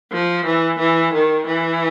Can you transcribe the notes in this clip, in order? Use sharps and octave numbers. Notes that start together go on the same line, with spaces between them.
F3
E3
E3
D#3
E3